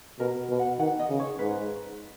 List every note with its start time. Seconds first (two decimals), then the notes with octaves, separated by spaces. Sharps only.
0.19 B2 A#4
0.50 B2
0.59 F#5
0.79 D#3 F#5
0.99 D#5
1.09 C#3
1.20 C#5
1.39 G#2 B4